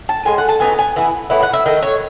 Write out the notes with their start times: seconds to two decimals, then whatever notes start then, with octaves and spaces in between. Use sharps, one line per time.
0.09 A5
0.25 A2 G#3 G#5
0.38 F#5
0.49 A5
0.60 F#3 B3 D#4 G#5
0.79 G#5
0.96 E3 B3 E4
1.30 A2 E3 B3 E4
1.43 F#5
1.53 E5
1.66 D#3 A3 E4 D#5
1.82 C#5